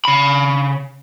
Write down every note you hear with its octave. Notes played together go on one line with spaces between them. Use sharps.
C#3 B5